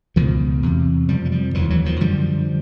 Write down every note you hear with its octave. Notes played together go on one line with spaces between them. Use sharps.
C#2 B2 D#3 F3
E2 C3
F2 C3 F3 G3
G#3
F3 G3
D#2 D3 E3 F#3
E3 F#3
D#3 F3
F#2 D3 F3 G3